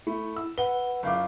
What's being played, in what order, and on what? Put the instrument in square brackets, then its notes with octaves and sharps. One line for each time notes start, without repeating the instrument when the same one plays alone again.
[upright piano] A3 [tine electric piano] E4
[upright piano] E6
[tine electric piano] B4 F#5 [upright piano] G7
[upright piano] F#1 F4 D6